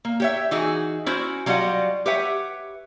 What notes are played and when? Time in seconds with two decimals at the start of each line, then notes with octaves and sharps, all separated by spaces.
0.05 A#3
0.20 G4 C#5 E5
0.51 E3 D#4 F#4 G#4
1.06 C#4 E4 F#4 C5
1.46 F#3 G3 F4 G4 D#5 F#5
2.06 G4 B4 C#5 E5 F#5